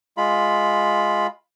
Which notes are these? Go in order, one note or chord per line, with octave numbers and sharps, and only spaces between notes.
G#3 F4 B5